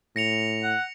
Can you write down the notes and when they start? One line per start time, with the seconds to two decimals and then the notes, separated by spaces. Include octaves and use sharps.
0.16 A2 A#6 C#7 F7
0.63 F#5